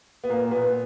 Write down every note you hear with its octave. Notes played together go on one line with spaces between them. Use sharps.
B3
A#2 A#3
A#2 B3